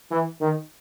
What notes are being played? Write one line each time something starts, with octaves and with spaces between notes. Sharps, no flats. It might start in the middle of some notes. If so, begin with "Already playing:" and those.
E3
D#3